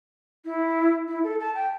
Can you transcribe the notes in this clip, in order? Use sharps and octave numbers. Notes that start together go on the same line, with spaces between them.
E4
E4
A4
A5
G5